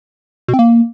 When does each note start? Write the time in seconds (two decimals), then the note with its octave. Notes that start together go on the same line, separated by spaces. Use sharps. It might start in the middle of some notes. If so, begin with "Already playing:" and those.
0.48 B2
0.54 C4
0.59 A#3